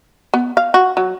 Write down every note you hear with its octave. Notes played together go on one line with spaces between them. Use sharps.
B3
F5
F#4
F#3